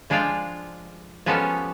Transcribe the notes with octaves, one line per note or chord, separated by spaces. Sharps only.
F3 G#3 D4 F4 F5 G5
F3 G#3 B3 C#4 G4 A4